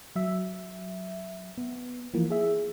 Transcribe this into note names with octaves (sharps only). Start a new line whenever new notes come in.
F#3 E5
B3
E3 F3 A#3
G#4 E5